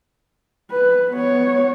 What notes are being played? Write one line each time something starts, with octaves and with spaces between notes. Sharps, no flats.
B4
B3 C#5